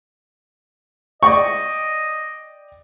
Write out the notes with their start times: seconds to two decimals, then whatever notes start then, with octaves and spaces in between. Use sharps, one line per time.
1.23 D5 D#5 G5 C#6